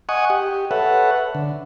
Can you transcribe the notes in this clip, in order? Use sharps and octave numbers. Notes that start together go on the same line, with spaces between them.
D#5 F#5 G#5 C#6 D#6
G4
A4 B4 C#5 E5 F#5
D3